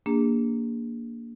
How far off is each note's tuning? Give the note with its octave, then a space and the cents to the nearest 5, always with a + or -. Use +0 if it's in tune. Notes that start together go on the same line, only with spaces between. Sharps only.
A#3 +0 D4 -15 G#4 -30